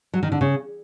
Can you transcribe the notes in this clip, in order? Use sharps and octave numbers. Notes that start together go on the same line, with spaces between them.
F#3
D#3
D3
C#3